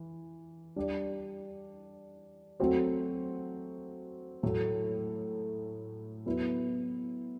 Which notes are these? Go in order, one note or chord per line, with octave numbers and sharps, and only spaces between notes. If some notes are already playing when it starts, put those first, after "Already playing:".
Already playing: E3
G3 D4 G4 D5
F#3 A3 C4 F#4 C5
A2 F#3 A3
F#3 B3 E4 B4